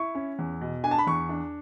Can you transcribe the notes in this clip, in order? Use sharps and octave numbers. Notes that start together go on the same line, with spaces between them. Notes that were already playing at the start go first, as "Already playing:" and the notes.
Already playing: E4 C#6
C#4
E2
B2
D4 G#5
A5
B5
E2 C#6
D4